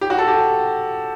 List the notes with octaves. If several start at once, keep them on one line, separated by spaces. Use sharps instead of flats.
G4
F#4
A4
G4